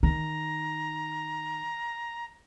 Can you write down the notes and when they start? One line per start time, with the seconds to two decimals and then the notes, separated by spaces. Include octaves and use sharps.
0.03 D#3 A#5